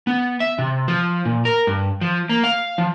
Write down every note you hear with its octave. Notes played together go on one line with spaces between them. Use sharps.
B3
E5
C3
F3
A#2
A#4
G2
F3
A#3
F5
F3